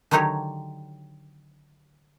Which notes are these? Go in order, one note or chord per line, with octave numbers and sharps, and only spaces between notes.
D3 D#3 F#3 D#4 G4 C#5